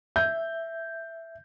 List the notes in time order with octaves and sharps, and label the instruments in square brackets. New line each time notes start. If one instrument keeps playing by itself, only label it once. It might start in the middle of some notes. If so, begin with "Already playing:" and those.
[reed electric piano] E5 [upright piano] G6